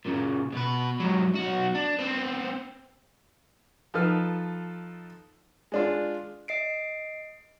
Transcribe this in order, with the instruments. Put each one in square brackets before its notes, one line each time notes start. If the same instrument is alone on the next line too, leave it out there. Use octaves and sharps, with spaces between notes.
[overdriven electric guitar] A#2 C#3
B2 B4
G#2 F#3
B1 F#4
D4
B3 C4
[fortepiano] F3 D#4 F4 A4 B4 F6
G#3 D4 F4
[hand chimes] D#5 C7 D7